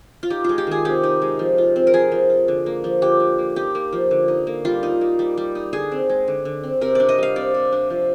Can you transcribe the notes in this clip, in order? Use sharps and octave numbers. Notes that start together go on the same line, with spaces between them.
F4
D#4 G4
G#3 F4
G4
D#3 G#4
C3 G4
D#4
G#3
F3
F4
C4
A#4
F3 G#4
F3
F4
D3
A#3
F3
D3 G4
D3
A#3
D#4 G4
A#3
F3
D3
D#4
A#3
G3 F4
D#4
A#3
G3
G3
D#4
D3 G#4
C4
G#3
D3
D3
C4
C3 A#4
D4 D5
D#5
G3 F5
C3 D5
C3
D4
F3